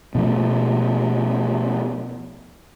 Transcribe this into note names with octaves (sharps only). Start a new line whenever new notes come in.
B2 F3 A3